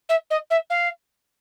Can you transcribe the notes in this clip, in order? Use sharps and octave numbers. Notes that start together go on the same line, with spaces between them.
E5
D#5
E5
F5